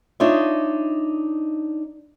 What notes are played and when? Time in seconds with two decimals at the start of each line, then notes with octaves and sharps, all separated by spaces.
0.20 D4 D#4 F4 C#5 D#5 E5